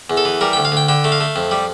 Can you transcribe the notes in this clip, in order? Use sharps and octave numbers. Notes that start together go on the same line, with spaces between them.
E2
A4
E3
G3 A#4
D2 G5
F5
D2 G5
D3 G5
A3
F5
A3
F2
G3